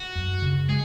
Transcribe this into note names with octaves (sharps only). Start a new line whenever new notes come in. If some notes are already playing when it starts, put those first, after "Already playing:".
Already playing: F#4
F#2
C#3
G#3 G#4